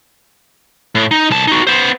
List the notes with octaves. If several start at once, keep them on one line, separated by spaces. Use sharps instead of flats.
A2
D#4
C2 A5
D#4 F#4
B3 C5